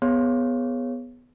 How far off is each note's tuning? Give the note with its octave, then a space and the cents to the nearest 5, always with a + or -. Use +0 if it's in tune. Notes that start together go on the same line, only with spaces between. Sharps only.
B3 +0 G#4 +0 C#5 -10